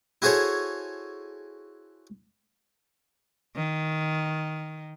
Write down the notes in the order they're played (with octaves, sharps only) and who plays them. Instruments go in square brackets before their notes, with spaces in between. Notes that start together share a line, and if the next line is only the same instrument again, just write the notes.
[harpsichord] E4 F#4 G#4 A4 C5 C#5
[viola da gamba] D#3